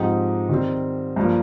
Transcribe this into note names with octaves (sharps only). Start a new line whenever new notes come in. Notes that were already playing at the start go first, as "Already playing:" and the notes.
Already playing: G#2 F3 C4 D#4 G4
D#3 G3 C4
G2 F3 A#3